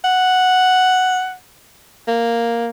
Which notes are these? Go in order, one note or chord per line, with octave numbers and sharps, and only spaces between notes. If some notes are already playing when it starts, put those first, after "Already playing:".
F#5
A#3